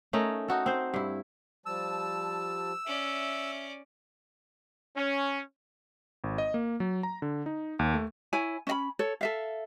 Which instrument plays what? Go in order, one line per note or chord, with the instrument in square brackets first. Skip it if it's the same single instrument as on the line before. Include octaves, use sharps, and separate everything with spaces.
[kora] A3 C#4 D#4 A#4
D#4 F#4 A4
C4 C5
G2 E4
[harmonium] F3 G3 A5 [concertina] E6
[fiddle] C#4 D5 [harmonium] E5
[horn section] C#4
[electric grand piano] G#1
D#5
A#3
F#3
A#5
D3
D#4
D#2
A3
[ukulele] E4 C#5 G#5
C#4 D#5 B5
A4 C#5
A4 E5 F5